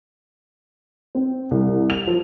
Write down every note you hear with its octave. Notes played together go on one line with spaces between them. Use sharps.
C4
C2
F7
F3